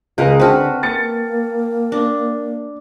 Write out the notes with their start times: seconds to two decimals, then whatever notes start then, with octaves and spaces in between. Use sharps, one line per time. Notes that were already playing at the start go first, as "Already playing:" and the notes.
0.18 C#2 G#3 A#4
0.40 D3 C4 F#4 B4 G5 A5 F6
0.83 A#3 A6 C#7
1.92 D4